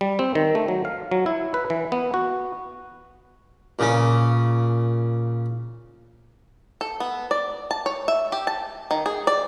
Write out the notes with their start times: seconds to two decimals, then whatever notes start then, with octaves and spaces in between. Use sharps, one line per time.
0.01 G3
0.19 C4
0.35 D#3
0.55 A3
0.68 F#3
0.85 F5
1.11 F#3
1.26 E4
1.54 B4
1.70 E3
1.92 B3
2.14 F#4
3.79 A#2 C#3 C#4
6.81 A4
7.00 B3
7.31 D5
7.71 A5
7.86 C#5
8.08 E5
8.32 G4
8.47 A5
8.91 D#3
9.06 G#4
9.27 D5